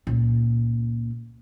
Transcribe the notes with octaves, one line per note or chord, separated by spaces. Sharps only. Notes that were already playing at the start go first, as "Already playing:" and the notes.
C#2 A#2